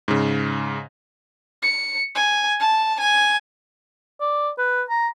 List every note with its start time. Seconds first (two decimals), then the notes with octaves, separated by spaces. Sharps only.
0.08 G#2 C#3
1.63 C#7
2.15 G#5
2.60 A5
3.00 G#5
4.21 D5
4.58 B4
4.90 A#5